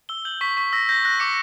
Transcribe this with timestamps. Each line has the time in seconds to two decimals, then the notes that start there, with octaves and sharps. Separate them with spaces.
0.09 E6 G7
0.25 G6 F#7
0.41 C#6 B6
0.57 C#6 B6
0.73 E6 A#6
0.89 G6 A#6
1.05 F#6 A#6
1.20 D6 C#7